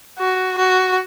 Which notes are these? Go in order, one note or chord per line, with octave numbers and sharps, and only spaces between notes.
F#4
F#4